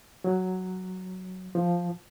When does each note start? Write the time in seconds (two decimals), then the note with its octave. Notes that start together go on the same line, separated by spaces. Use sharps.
0.24 F#3
1.55 F3